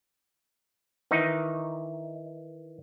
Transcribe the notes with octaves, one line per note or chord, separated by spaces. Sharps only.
D#3 E3 D#4